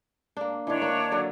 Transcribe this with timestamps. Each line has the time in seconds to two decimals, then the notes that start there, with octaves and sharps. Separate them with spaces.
0.37 A#3 D4
0.67 D#3 E3 D4 C#5
0.82 A#3
1.12 D3 F#3